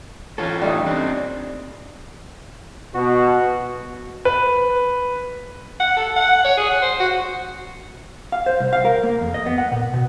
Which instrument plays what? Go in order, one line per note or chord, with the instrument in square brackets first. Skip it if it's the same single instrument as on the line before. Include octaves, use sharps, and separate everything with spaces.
[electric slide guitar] E3 F4 A4 [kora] C#4
[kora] G3 A3 D#4
[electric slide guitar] C4 D4
[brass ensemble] B2 [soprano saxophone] F#4
[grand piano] B4
[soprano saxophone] F#5
A4
F#5
C#5
G#4
F#5
C5
F#4
[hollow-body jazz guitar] F5
C5
C2
F5
A#4
A#3
F2
D#5
B3
F#5
A#2
B2